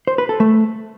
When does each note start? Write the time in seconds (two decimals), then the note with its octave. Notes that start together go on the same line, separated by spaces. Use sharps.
0.07 C5
0.18 B4
0.29 A4
0.40 A3